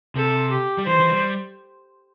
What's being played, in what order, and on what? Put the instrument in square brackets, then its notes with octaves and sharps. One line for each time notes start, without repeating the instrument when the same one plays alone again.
[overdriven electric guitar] C3 [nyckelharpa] A4
[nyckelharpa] G4
[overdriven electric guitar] G3
[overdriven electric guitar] E3 [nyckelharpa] C5
[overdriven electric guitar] E3
G3